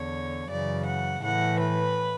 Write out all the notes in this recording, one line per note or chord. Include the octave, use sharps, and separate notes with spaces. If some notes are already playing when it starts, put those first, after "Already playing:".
Already playing: E2 D3 C#5
F#2 C#3 E3 D5
F#5
A2 E3 F#5
B4